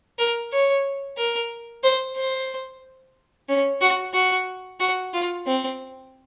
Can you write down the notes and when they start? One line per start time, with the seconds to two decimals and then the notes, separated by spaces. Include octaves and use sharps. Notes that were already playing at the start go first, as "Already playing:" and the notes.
0.19 A#4
0.52 C#5
1.17 A#4
1.84 C5
2.16 C5
3.49 C#4
3.81 F#4
4.14 F#4
4.80 F#4
5.13 F4
5.47 C4